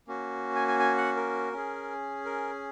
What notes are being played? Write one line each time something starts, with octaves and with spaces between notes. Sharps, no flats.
A#3 C#4 F#4
G#5
G#5
G#5
F#5
A#4
C#4 G#4
A#4